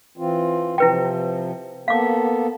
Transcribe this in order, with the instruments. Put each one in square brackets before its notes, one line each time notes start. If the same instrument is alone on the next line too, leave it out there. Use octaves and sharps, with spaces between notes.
[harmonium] E3 C4 F4
[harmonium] C3 F3 [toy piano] E4 B4 G5
[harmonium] A#3 B3 A4 [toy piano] F5 D6